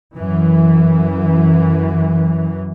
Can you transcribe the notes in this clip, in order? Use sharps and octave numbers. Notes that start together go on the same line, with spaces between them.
F#2 E3